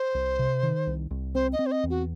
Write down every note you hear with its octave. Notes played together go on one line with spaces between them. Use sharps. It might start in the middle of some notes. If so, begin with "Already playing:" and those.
Already playing: C5
C2
C3
D#3
C2
C2
C4 C5
D#5
C4
C5
D#5
E2
F#4